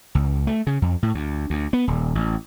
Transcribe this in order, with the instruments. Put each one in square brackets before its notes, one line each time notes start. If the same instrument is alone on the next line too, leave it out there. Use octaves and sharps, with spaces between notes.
[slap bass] C#2
A3
C#3
F2
A2
D2
D2
B3
D#1
A1